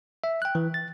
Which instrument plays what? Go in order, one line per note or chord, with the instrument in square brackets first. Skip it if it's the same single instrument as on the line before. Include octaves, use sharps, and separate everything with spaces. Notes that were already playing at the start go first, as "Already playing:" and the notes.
[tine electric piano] E5
G5 F#6
E3
A6